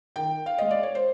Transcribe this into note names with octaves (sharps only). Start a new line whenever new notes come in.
D#3 G5
F5
G#3 D#5
D5
C#5
C5